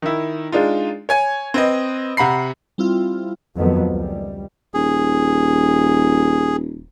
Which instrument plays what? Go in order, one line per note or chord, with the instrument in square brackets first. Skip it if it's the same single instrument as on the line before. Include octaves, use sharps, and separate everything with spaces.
[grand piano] D#3 E4
G#3 D4 D#4 F4
C#5 G#5 G#6
C4 B4 D#5
C3 F#5 A#5 B5 C7
[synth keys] G3 C4 E4 F4
[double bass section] F2 D#3 F#3 A3 B3
C#2 G3
[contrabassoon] D#1 [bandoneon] G#4